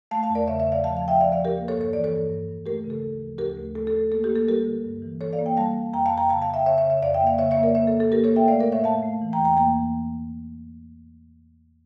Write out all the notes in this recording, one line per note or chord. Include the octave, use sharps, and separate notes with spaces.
A3 F5 A5
F5 A5
E2
A#4 D5
C#3 C#5 E5
C#5 E5
C#3
D5 F5
F3 F5 A5
F5 A5
F3
E5 G5
F3 D5 F5
D5 F5
F3
G4 A#4
A#3
A4 C#5
G2
C#5
E3 D5
A4 C#5
G2
G2
G2
A3 G4 A#4
C#3
A4
D2
F3
D2 G4 A#4
A3
A3 A4
A4
A3
A#3 A4
G4
A#3
A4
G3 G4 A#4
D3
G2
E3
E3 A4 C#5
D5 F5
A#3
G5
G3 F5 A5
G3
F2 G5 A#5
F5 A5
F2
G5 A#5
C#3 F5 A5
F5 A5
C#3
E5 G5
C#3 C#5 E5
C#5 E5
C#3
C#5 E5
F2 D5 F5
E5 G5
A#3
D5 F5
C#3 C#5 E5
C#5 E5
A#3
A#4 D5
A#3 C#5 E5
A4
A#2
A4
A#3 G4 A#4
A4 C#5
A#3
E5 G5
A3 D5 F5
A#4 D5
A2
C#5 E5
A3 F5 A5
A3
E3
G5 A#5
E2
G5 A#5
A#3 G5 A#5
E3